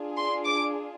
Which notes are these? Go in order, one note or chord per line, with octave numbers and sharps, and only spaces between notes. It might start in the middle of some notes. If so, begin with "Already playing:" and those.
Already playing: D4 F4 G#4
C6
D6